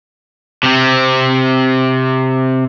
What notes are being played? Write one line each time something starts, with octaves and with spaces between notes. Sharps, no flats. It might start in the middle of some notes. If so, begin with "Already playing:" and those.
C3 C4